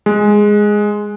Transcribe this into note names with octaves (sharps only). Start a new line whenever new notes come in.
G#3